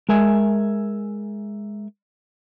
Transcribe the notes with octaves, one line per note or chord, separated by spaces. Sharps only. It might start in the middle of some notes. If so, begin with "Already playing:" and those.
G#3 A#4 E5 G#5